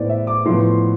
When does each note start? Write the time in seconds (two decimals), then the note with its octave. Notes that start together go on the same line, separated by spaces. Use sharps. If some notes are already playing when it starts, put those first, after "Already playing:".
Already playing: A2 E3 B3 C5 D5
0.09 E5
0.27 D6
0.45 A2 F3 B3 C6